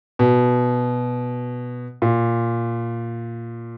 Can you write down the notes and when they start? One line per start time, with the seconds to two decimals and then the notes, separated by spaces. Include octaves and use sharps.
0.19 B2
2.02 A#2